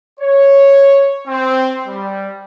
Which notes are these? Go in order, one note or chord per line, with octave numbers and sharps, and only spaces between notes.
C#5
C4
G3